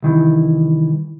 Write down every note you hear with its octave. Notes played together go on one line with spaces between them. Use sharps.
C2 D#3 E3